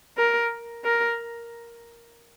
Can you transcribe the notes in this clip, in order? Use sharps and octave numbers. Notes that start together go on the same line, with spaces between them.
A#4
A#4